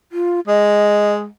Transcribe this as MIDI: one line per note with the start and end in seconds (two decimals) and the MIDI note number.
0.12 0.40 65
0.47 1.27 56
0.47 1.12 75